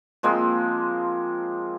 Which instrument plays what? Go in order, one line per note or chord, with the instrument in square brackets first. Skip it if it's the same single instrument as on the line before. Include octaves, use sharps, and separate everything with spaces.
[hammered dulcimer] F3 G#3 A#3 C4